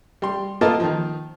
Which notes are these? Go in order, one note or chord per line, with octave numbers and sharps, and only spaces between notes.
G3 C6
A#3 B3 F4 A4 D#5 A5
D#3 F3